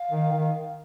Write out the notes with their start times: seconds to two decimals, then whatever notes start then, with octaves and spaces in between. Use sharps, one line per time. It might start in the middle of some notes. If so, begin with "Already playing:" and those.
Already playing: F5
0.11 D#3
0.32 D#3